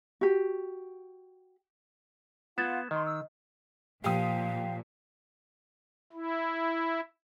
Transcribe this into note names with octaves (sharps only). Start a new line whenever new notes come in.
F#4 G4
B3 F4 F#5 G#6 A6 E7
D#3 D#5 C6
E6
A#2 F3 G4 F5 D#6
E4